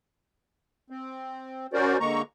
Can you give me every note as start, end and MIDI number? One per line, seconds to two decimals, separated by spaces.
0.90 1.67 60
1.73 1.98 61
1.73 1.98 66
1.73 1.98 70
1.73 1.98 72
1.73 1.98 74
2.00 2.22 50
2.00 2.22 56
2.00 2.22 58
2.00 2.22 82
2.00 2.22 85